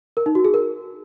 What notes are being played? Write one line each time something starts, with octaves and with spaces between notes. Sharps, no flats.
A#4
D#4
F#4
G#4
A#4